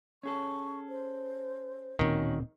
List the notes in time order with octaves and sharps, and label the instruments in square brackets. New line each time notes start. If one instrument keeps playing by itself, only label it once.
[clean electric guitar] C#4 G#4 A4 [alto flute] C#6
[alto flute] C5
[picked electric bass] D1 A#2 C4 [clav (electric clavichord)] D#3 [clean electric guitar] A#3 C#4 F#4